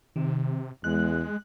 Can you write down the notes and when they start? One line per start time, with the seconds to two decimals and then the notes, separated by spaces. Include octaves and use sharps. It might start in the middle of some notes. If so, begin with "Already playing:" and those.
0.16 C3 D#3
0.84 E2 G#3 F#6